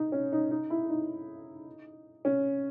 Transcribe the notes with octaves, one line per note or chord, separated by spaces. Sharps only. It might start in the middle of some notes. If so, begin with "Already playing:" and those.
Already playing: D#4
C#4
D#4
D#4
E4
D#4
C#4